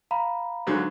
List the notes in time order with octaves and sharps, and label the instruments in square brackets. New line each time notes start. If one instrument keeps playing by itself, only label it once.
[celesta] F5 A#5 B5
[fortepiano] G#2 D3 F#3